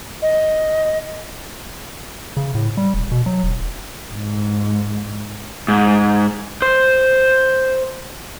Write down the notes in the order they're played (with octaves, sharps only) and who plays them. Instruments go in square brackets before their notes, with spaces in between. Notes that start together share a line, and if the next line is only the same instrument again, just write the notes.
[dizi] D#5
[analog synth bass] C#3
A2
G3
E1
B2
F#3
E1
[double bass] G#2
[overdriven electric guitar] G#2
C5